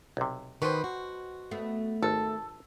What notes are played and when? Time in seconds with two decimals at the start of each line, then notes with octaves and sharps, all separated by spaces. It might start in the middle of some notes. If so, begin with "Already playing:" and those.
0.17 B1 C3
0.62 B2 D#3 B4 C5
0.84 F#4
1.51 A3 B3
2.03 G#1 A4